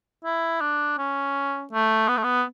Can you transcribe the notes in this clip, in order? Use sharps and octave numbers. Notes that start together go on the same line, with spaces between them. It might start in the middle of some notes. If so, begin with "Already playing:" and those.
E4
D4
C#4
A3
B3
A3
B3